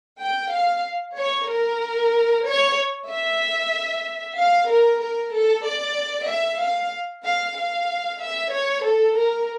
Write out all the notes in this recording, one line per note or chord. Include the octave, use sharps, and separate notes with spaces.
G5
F5
C#5
A#4
C#5
E5
F5
A#4
A#4
A4
D5
E5
F5
F5
F5
E5
C#5
A4
A#4